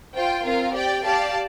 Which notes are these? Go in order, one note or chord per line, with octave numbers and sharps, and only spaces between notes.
F4 C5 G5
C4 F4 A#4 F5
G4 D5 G5
G4 D5 F5 A5